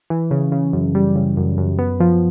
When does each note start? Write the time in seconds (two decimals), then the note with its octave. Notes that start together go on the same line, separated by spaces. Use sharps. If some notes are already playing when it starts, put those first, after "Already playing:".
0.10 E3
0.31 C#3
0.52 C#3
0.73 F#2
0.95 G3
1.15 C#3
1.37 F#2
1.58 F#2
1.79 B3
2.00 F3